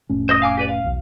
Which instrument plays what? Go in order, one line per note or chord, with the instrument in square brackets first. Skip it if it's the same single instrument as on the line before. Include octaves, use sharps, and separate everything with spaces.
[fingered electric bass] F1 A2 C#4
[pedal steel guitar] C5 D#5 D#6
F5 G#5 D6
G4 B4 D5
F5
[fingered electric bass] B1 E2